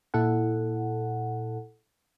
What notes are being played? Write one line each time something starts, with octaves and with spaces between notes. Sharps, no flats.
A#2 E4 A4 F#5